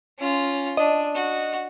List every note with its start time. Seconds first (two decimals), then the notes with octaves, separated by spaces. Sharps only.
0.18 C#4 F4
0.77 D4 D#5
1.15 F#4